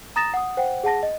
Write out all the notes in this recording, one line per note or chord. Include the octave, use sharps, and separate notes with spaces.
A#5 D#6 A6 A#6 E7
F#5 D#6
C5 F#5 G5
G#4 F#5 A5 A#6
D#5